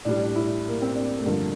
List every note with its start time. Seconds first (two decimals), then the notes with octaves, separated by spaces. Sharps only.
0.05 A2 G3 D4
0.24 D4
0.36 E4
0.68 A#3
0.82 C4
0.95 D4
1.19 A3
1.25 G2 D3 F3 A#3